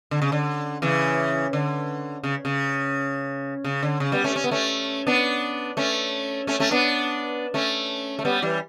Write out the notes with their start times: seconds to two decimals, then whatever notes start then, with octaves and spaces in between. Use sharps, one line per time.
0.11 D3
0.22 C#3
0.32 D3
0.82 C#3 E3
1.53 D3
2.23 C#3
2.45 C#3
3.64 C#3
3.82 D3
4.00 C#3
4.12 G3 B3
4.24 A3 C#4
4.36 C#4
4.44 B3
4.51 A3 C#4
5.07 B3 D4
5.77 A3 C#4
6.47 A3 C#4
6.60 A3 C#4
6.71 B3 D4
7.54 A3 C#4
8.19 A3
8.25 G3 B3
8.42 E3 G3